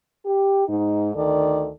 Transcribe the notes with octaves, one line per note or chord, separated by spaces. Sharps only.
G4
G#2 D#4
D2 D#3 A4 D5